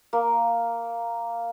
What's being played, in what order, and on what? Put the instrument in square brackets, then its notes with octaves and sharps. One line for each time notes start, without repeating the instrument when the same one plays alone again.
[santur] A#3